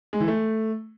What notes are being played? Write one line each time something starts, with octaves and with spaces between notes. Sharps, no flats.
G#3
E3
A3